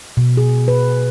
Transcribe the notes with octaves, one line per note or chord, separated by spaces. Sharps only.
B2
G#4
B4